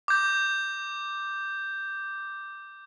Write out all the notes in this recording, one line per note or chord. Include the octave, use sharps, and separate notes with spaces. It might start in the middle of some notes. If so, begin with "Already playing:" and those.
D6 G6